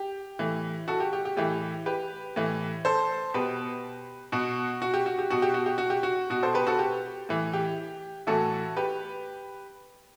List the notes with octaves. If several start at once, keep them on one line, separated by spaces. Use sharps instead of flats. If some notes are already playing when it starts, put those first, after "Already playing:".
Already playing: G4
A2 E3
F#4 A4
G4
G4
G4
A2 E3 G4
G4 B4
A2 E3
A4 C5
B2 G4 B4
B2 F#4
F#4
G4
F#4
G4
B2 F#4
G4
F#4
G4
F#4
G4
F#4
B2 F#4
A4 C5
G4 B4
F#4 A4
G4
A2 E3
G4
A2 E3 F#4 A4
G4 B4